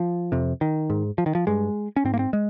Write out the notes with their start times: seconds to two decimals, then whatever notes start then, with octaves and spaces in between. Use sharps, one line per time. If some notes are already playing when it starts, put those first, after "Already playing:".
Already playing: F3
0.32 F2 C3
0.61 D#3
0.90 G#2
1.18 F3
1.26 D#3
1.35 F3
1.47 G2 G#3
1.96 C#4
2.05 G#2 C4
2.14 A#3
2.19 C4
2.33 G#3